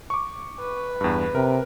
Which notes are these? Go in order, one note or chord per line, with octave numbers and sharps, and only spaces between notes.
C#6 D6
B4
E2 G2
C3 A#4